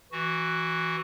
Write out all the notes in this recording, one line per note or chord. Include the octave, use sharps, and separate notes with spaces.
E3 F#4